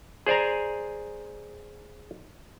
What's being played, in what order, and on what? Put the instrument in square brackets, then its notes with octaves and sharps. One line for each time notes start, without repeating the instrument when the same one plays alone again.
[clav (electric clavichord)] G#4 C5 D5 G#5 A#5